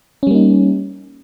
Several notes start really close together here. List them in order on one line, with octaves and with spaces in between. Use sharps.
C#4 G3 A#3 D#4